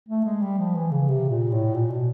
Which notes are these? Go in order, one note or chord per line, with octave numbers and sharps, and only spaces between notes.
A3
G#3
G3
F3
E3
C#3
C3
A#2
A2
A#2
B2